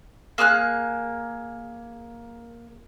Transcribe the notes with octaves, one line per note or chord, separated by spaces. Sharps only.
A#3 G#4 F6 F#6